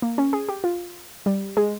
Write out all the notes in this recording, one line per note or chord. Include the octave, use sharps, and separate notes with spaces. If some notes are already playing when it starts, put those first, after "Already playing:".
A#3
C#4
G#4
G4
F4
G3
G#3